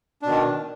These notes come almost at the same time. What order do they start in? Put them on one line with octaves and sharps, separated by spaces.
D4 B2 D#3